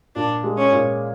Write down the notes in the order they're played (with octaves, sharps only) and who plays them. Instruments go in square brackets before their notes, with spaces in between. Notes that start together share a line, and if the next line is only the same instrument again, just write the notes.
[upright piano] A#2 [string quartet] D4
[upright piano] G#3
[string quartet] C#4
[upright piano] A#2